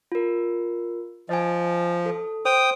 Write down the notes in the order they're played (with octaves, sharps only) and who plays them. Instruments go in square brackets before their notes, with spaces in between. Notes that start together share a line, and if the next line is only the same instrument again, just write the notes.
[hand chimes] F4 A#4
[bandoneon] F3 [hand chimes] D#5 G#5
[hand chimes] A4
[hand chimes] C5 [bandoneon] G5 D#6